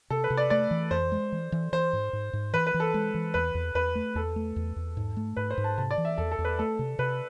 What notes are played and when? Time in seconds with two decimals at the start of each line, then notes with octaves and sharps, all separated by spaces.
0.10 C3 A4
0.24 B4
0.30 C3
0.37 D5
0.50 A3 D5
0.71 E3
0.91 F2 C5
1.12 G#3
1.32 E3
1.52 E3
1.73 E3 C5
1.93 G#2
2.13 G#2
2.33 G#2
2.53 E3 B4
2.67 B4
2.74 E3
2.80 A4
2.94 G#3
3.15 E3
3.34 E2 B4
3.55 E2
3.75 E2 B4
3.95 A3
4.15 E2 A4
4.36 A3
4.56 E2
4.76 E2
4.97 G#2
5.17 A3
5.37 G#2 B4
5.51 C5
5.58 G#2
5.64 A5
5.78 C3 A5
5.91 D5
5.98 E3
6.05 E5
6.18 E2 A4
6.32 A4
6.39 E2
6.45 B4
6.59 A3 A4
6.79 C3
6.99 C3 B4